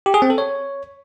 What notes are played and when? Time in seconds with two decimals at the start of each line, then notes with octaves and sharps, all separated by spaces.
0.06 G4
0.14 G#4
0.22 C4
0.30 A4
0.38 C#5